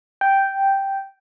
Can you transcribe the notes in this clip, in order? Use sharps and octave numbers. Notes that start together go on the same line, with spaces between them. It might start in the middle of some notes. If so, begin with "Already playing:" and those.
G5